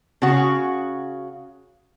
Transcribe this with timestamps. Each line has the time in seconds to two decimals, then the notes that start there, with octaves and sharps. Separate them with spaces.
0.22 C#3 F#4